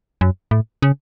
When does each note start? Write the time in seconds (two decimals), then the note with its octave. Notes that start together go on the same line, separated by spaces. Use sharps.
0.21 F#2
0.51 A2
0.82 C#3